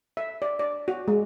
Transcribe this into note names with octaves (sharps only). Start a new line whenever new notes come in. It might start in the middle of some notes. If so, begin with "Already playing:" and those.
E5
D5
D5
F#4
G#3